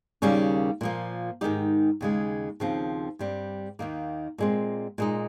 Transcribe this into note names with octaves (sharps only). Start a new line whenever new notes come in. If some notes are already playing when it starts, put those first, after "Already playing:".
D#2 C#3 G3 A#3 C#4
A#2 F3 A#3
G#2 D#3 G#3 D#4 G4
D#2 C#3 G#3
D#2 C#3 F3 C4
G2 G3 C4
D#2 D#3 A#3
A#2 G#3 C4
A#2 G#3 D#4